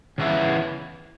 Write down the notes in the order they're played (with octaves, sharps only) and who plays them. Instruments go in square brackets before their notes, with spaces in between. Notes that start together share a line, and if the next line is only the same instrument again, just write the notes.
[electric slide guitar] C#3 E3 B3 E4